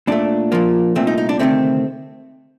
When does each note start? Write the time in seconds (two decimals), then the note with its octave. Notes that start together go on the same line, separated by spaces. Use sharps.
0.07 A#2 A3 D4
0.52 A#2 F3 A#3
0.95 C2 A#2 A3 C4
1.07 D#4
1.18 D#4
1.29 D4
1.39 D2 C3 D#3 A3 C4